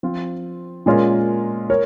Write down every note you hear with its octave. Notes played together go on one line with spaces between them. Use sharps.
F3 C4 F4
A#2 G#3 C#4 F4 A#4
A#4 C#5